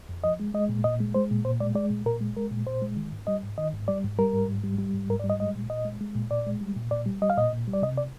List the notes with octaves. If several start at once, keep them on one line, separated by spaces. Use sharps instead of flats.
F2
F3 D#5
G#3
G#3 D#5
A#2
A#2 D#5
G#3
G#3 C5
A#2
A#2 C5
G#3 D5
G#3 D5
A#2
A#2 A#4
G#3
G#3 A#4
A#2
A#2 C5
G#3
D#3
G#2
G3 D#5
G#2
D#3 D#5
G#2
G3 D5
G#2
G3 A#4
G#2
G#2
G3
G3
G#2
G#2 A#4
D5
G3
D#5
G#3 D#5
A#2
A#2 D#5
G#3
G#3
A#2
A#2 D5
G#3
G3
A#2
A#2 D5
G3
G3 D#5
F5
A#2 D#5
A#2
G3
D5
C3 D#5
D5